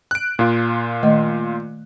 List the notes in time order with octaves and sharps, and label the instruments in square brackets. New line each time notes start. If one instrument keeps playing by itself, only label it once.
[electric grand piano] F#6 D7
A#2 F4
[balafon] D#3 A3 D#5